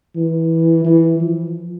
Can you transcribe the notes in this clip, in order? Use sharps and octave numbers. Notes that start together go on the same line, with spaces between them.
E3
E3
F3